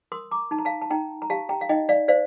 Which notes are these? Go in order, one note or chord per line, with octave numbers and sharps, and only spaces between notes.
A#4 C6 D#6
A#5 D6
D#4 A5
A#5
F5 A5
A5
D#4 G5 A#5
A#5
G4 F5 A5
G5 A#5
F5
D#4 D#5 G5
D5 F5
C5 D5 F5